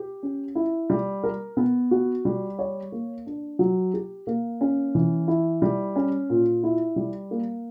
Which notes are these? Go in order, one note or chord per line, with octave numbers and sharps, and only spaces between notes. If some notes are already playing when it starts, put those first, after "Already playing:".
Already playing: G4
C#4
E4
G3
A#4
B3
F#4
G3
C#5
A#3
D4
F#3
G4
A#3
C#4
E3
E4
G3
C#4
A#2
E4
G3
A#3